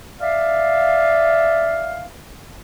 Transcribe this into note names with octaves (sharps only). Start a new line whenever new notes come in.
D5 E5 F5